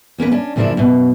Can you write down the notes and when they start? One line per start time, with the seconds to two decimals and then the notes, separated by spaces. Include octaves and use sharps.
0.18 E2 A#3 C#4 B4
0.32 C#4 D4
0.56 F#2 C#3 F3 A#3 D4 E4
0.77 F#2 B2